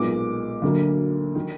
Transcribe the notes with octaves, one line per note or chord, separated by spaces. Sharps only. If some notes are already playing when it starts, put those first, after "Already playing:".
Already playing: B1 A#2 G#3 B3 D6
D2 D3 F#3 A#3
D#3